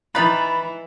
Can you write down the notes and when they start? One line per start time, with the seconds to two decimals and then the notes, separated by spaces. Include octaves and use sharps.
0.15 E3 D#4 B4 B5 A6